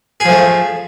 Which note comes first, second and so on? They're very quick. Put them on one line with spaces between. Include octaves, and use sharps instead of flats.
G#4 F3 A3